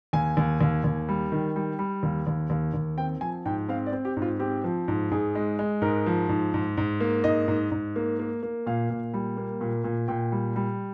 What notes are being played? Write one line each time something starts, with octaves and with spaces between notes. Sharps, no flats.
D#2 G#5
D#2
D#2
D#2
G3
D#3
G3
G3
D#2
D#2
D#2
D#2
C4 G5
F3 G#5
G#2 G5
C4 F5
D5
C4
G4
G#2
F4
C4 G4
F3
G#2
G#2 G#4
G#3
G#3
G#2 A#4
F3
G#2
G#2
G#2
A#3
G#2 D#5
G#2
G#2
A#3
A#3
A#3
A#2 F5
A#2
G3
A#3
A#2
A#2
A#2 G5
G3
G3